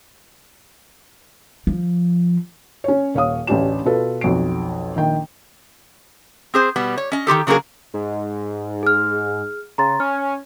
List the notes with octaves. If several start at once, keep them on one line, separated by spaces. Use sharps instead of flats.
F3
C#4 C#5
D#1 C#5 F5 D#6
A1 D2 C#4 D4 G4 E7
B2 F4 A4 B4
B1 F2 F#4 D7
A#1 D#3 G5
C4 G#4 C5
B2 G3 B3
C#5
C#4 D#5
D#3 F4 G4 A4
C#3 F#3 A#3 D4 G#4 A#4
G#2
G#4 F6
C#3 A#5 C6 A6
C#4 F6